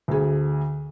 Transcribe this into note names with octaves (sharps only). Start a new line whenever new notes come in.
D2 G#4